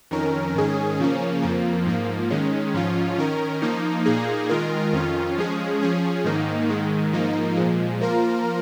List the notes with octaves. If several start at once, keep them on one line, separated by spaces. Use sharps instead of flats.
F2 D#3 C#4 A#4
G#2 D#3 C#4 G#4
C#3 F3 A#3 C#4
F2 F3 A#3
G#2 F3 A#3
D#3 G#3 C#4
G#2 F3 C#4 F4
D#3 C#4 A#4
F3 A#3 D#4
A#2 A#3 D#4 G#4
D#3 G#3 F4 A#4
F2 D#3 C#4 F4
F3 G#3 C#4 G#4
F3 C#4 G#4
G#2 D#3 A#3 D#4
G#2 D#3 G#3
G#2 F3 A#3 D#4
A#2 F3 G#3
F3 A#3 F4 A#4